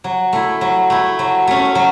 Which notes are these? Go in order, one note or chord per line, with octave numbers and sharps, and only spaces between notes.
F#3
A3 E4
F#3
A3 E4
F#3
A3 C#4
F#3